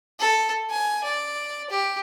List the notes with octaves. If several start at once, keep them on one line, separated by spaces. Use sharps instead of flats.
A4
G#5
D5
G4